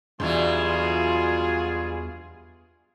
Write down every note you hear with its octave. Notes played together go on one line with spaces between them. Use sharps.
E2 G2 B2 E3 F#3 F4 G#4